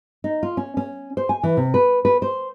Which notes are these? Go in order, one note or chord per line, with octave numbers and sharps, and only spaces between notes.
D#4
F4
C#4
C#4
C5
G#5
E3
C3
B4
B4
C5